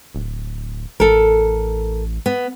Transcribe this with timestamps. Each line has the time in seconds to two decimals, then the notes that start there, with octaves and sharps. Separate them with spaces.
0.15 D1
1.00 A1 A4 A#4
2.26 B3